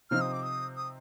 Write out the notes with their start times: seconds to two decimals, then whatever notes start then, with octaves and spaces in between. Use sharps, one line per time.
0.10 C3 F3 C4 D#4 F6
0.21 D#6
0.33 D6
0.43 D#6
0.77 D#6